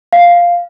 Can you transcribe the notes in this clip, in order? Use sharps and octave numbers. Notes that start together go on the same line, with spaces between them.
F5